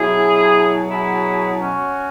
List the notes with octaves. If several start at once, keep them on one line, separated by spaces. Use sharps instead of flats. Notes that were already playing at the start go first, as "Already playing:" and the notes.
Already playing: B2 F#3 E4 G#4
E4 G#4
C#4 F#4